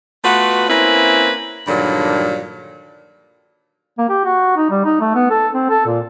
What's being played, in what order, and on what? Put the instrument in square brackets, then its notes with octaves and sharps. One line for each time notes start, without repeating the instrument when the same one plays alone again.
[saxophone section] A3 B3 F4 F#4 B4
A#3 C4 C#4 E4 B4
G2 A#2 D3 D#3 F#3
[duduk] A#3
G4
F#4
D#4
G3
D#4
A3
B3
A4
C4
A4
A#2